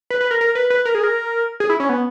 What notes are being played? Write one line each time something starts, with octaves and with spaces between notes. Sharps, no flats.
B4
B4
A#4
A#4
B4
B4
A#4
G#4
A#4
G#4
E4
C#4
B3